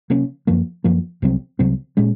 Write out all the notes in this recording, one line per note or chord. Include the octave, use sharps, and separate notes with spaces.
C3 F#3 A#3 C#4
F#2 F3 A#3
F#2 F3 A#3
C2 C3 F#3 C4
C2 C3 F#3 C4
A#2 G#3 C#4